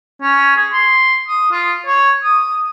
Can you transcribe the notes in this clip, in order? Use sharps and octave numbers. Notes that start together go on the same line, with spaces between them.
C#4
G#4
C6
D#6
F4
C#5
D#6